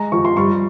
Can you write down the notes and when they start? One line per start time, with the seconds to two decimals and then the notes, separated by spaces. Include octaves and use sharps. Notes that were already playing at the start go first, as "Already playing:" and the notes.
Already playing: G#3 A#5
0.12 F3 C#6
0.25 C6
0.37 G3 C#6